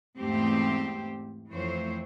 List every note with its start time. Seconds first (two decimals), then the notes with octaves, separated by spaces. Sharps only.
0.18 E2 G#2 A3 C4 G4 C5
1.52 F2 E3 A3 C4 C5 C#5